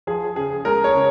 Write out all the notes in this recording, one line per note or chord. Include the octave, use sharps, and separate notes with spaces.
F3 G#4
C#3 G#4
G#3 A#4
C#5
C#3